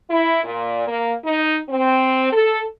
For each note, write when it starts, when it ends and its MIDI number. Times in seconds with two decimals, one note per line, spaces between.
0.10 0.43 64
0.44 0.85 46
0.88 1.13 58
1.25 1.58 63
1.70 2.32 60
2.32 2.62 69